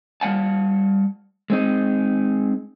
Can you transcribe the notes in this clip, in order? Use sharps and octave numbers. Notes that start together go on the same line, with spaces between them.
G3 F5 F#5 A5
G#3 C4 D#4